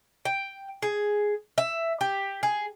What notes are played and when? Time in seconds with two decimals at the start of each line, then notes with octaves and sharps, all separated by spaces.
0.25 G5
0.82 G#4
1.58 E5
2.01 G4
2.43 G#4